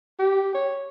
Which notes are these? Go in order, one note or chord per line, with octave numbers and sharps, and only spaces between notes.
G4
C#5